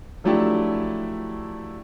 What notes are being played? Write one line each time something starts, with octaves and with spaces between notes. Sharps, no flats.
F3 F#3 A3 D4 E4 G4